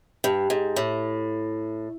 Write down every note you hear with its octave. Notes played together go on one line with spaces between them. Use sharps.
G2
G#2
A2